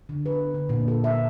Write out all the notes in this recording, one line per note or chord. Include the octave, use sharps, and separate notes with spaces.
D3
B4
D3
A#2
A4
E5